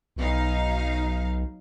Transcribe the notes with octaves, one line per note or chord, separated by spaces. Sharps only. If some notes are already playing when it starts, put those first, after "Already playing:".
B1 F#3 D#4 F5